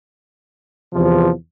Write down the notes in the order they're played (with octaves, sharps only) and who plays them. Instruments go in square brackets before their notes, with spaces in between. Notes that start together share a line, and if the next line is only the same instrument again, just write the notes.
[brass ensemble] E2 C3 F3